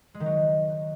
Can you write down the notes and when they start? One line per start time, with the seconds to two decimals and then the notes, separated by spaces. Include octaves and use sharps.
0.14 G#3
0.20 D#3
0.26 F#3